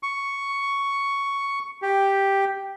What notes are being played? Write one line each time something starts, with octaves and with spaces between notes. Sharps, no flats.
C#6
G4